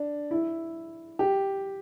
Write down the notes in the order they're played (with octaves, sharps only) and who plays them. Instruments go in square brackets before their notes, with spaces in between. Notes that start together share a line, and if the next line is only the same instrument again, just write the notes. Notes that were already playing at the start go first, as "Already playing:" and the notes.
Already playing: [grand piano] D4
E4
G4